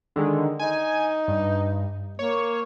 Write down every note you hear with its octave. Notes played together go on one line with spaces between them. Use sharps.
D3 D#3 G#3
D#4 G#5
G2
A#3 C#5